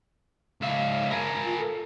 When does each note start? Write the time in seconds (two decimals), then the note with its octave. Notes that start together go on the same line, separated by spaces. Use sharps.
0.61 C#2 E5 F5
1.11 G#4 A#4
1.43 F4
1.58 A4